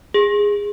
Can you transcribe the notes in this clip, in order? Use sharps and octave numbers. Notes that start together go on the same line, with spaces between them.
G#4